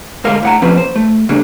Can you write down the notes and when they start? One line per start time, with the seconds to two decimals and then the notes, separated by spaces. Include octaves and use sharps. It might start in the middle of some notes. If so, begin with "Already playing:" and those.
0.24 D2 G#3 A#4 F5
0.43 A2 F#5 A#5
0.62 F3 A#3 C4 C#4 B4
0.77 C5
0.96 A3
1.29 C#3 G3 A3 A#3 D4